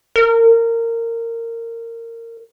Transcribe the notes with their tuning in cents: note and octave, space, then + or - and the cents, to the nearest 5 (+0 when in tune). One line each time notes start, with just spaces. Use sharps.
A#4 -20